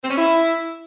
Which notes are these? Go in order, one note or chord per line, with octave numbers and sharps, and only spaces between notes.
C4
C#4
E4